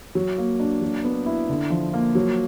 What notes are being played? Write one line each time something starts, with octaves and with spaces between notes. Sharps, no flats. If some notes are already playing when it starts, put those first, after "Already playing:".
F#3
A#3
D4
F#3
B3
E4
D3
F3
A#3
F#3